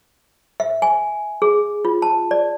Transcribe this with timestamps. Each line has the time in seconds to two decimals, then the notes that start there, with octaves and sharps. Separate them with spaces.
0.60 E5
0.82 G#5
1.42 G#4
1.85 F4
2.02 A5
2.31 D5